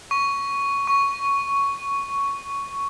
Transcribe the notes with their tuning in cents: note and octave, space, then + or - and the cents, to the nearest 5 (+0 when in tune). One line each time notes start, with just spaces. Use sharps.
C#6 +10
C#6 +5